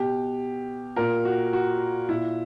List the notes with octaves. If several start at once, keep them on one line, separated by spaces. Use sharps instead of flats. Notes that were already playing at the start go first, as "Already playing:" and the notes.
Already playing: B2 G4
A#2 A#4
F#4
F#4
A#2 E4